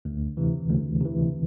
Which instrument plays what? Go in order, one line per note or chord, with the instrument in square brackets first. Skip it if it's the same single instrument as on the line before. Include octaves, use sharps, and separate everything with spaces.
[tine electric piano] D2
C3 E3
D2
C3 E3